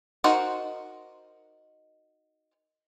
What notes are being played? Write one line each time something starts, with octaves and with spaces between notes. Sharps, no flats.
D#4 F#4 A#4 C5 F#5